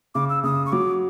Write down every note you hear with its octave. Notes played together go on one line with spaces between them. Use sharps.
C#3 D6
E6
C#3 D#6
C#6
F#3 D6